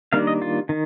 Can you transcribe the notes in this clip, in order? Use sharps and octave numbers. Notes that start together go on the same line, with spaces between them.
D#3 G3 A#3 D4 F5
D#5
F4
D#3